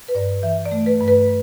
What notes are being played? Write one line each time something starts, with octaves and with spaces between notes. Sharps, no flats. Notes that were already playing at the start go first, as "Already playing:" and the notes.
B4
G2 D5
E3 E5
D5
A3
B4
G2
B4